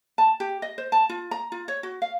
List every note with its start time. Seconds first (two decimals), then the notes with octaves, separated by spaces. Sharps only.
0.18 A5
0.40 G4
0.62 D#5
0.78 C5
0.92 A5
1.09 F4
1.31 A#5
1.52 F4
1.68 C#5
1.83 F#4
2.02 F5